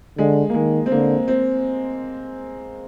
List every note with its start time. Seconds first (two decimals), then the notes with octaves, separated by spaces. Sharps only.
0.18 D3 G#3
0.50 A#3
0.54 D#3 G#3
0.86 C4
0.91 D3 A#3
1.28 C4